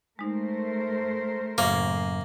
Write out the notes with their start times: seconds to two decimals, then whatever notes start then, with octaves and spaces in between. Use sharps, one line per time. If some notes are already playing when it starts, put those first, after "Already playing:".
0.19 G#3 A3 D#4 A#4 C5
1.58 F#2 A2 C#3 A#3 D6